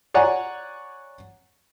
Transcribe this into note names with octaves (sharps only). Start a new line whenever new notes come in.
C#5 D5 F#5 G#5 A#5